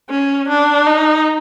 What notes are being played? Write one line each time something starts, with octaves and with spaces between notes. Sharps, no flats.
C#4
D4
D#4